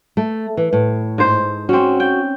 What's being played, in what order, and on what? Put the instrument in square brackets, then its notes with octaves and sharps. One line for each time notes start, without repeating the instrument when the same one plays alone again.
[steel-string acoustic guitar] A3
E3
A2
[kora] G#2 C5
[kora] C4 C#4 [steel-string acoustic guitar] F#4
[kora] G5